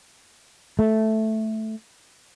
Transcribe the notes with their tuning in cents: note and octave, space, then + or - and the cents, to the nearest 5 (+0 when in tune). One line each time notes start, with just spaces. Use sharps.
A3 -5